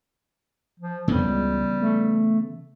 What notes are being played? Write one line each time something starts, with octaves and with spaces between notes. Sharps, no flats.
F3
F2 C#3 E3 G3 B3
C#2
A3